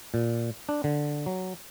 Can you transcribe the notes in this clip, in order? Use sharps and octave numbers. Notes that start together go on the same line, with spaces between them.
A#2
D4
D3
F#3